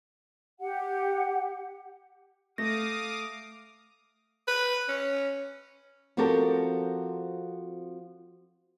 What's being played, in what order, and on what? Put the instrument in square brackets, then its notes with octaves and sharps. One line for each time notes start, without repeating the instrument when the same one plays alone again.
[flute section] G4 F#5
[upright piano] A3 [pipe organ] F5 D6 D#6 [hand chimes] A#6
[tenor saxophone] B4
C#4
[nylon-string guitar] F3 C4 F#4 G4 A4 A#4